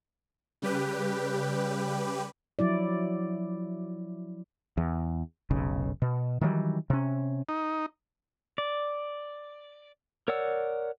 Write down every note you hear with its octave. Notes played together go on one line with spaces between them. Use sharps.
C#3 G3 G4 B4
F3 F#3 E4 D5
E2
F1 B1 C#3
B2
D#3 E3 F#3 G3
C3 C#4
D#4
D5
A#4 C#5 D5 F#5 E6